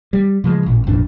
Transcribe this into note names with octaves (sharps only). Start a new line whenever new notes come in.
G3
C#3 F3 G3 G#3
A1 A#2
G#1 F2 A#2 D4